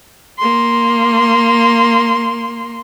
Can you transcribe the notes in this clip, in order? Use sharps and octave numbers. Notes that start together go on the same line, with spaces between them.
A#3 C6